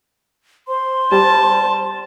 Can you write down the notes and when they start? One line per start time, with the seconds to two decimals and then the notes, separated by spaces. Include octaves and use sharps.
0.68 C5 C6
1.11 G3 A5